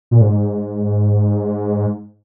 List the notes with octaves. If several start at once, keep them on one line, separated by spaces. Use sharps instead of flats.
A#2
G#2